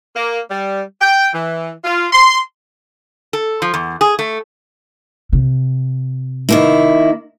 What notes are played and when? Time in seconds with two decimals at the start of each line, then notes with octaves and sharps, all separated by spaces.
0.16 A#3
0.50 G3
1.02 G5
1.34 E3
1.84 F4
2.13 C6
3.33 A4
3.62 F3
3.74 E2
4.01 G#4
4.19 A3
5.33 C3
6.49 D#3 A#3 E4